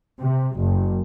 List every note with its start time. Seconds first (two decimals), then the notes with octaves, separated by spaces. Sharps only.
0.20 C3
0.57 F#1